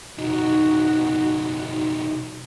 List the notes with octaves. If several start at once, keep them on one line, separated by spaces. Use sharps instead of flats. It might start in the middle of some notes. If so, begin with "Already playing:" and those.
B1 F2 D#4 F#4